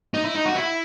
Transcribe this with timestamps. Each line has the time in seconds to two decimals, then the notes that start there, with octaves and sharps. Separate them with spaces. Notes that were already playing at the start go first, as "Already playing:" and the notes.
0.14 D#4
0.24 E4
0.35 D#4
0.45 F#4
0.56 E4